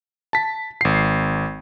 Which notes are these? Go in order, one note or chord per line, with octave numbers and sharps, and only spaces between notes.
A5 B6
G#1 C7